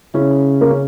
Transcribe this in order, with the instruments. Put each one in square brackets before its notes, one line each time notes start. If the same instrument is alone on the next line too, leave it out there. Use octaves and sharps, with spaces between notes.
[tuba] C#3 [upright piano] C#4 E4
[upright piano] A#3
C#4